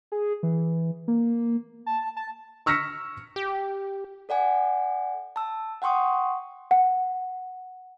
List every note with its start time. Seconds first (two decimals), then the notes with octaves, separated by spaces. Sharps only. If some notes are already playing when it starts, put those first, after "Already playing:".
0.12 G#4
0.43 E3
1.08 A#3
1.86 A5
2.16 A5
2.66 C#6 E6 F6 A#6 B6 C#7
3.36 G4
4.29 A4 D5 F#5 G#5
5.36 A5 E6
5.82 F#5 G5 C6 C#6 D#6
6.71 F#5